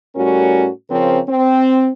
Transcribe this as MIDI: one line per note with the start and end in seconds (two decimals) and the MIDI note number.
0.15 0.67 45
0.15 0.67 55
0.15 0.67 61
0.15 0.67 66
0.15 0.67 70
0.90 1.19 49
0.90 1.19 53
0.90 1.19 60
0.90 1.19 61
0.90 1.19 70
1.27 1.88 60